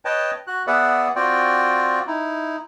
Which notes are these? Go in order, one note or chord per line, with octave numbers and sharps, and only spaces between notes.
B4 C#5 D#5 G5 A5
F#4 F#6
B3 G#4 B4 D5 E5 F#5
C4 F4 F#4 D5 G5
D#4 E4